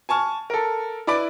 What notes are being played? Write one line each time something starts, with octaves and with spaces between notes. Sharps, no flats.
G#5 A5 C#6 F6
A4 A#4
E4 B4 D5 E5 D6